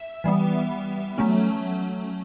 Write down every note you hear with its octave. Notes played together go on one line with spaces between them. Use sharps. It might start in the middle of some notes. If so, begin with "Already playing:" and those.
Already playing: E5
E3 G3 B3
F#3 A3 C#4